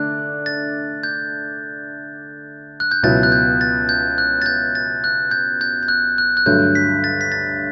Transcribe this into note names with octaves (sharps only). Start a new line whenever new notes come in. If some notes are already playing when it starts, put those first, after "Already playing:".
Already playing: D3 A3 D4 D5 F#6
A6
G6
F#6
G6
C#2 B2 F#3 B3 E4 A6
F#6
G6
A6
G6
F#6
A6
G6
A6
F#6
G6
G6
G6
F#6
F#6
F#6
G2 D3 F#3 A3 G6
B6
A6
B6
A6